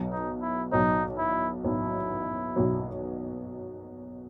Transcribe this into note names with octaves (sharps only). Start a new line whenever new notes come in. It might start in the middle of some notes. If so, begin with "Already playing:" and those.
Already playing: B1 B2 F#3
D#4
E4
B1 B2 F#3 D#4
E4
B1 B2 F#3 E4
B1 B2 F#3